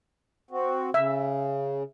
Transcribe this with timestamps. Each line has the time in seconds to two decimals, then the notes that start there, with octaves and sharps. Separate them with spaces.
0.51 C4 F#4
0.94 C#3 E5